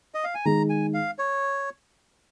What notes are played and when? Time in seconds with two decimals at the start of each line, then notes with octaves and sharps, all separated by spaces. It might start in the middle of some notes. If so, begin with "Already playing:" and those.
0.14 D#5
0.24 F5
0.35 G#5
0.45 D#3 G#3 D#4 G#4 A#5
0.70 G#5
0.94 F5
1.19 C#5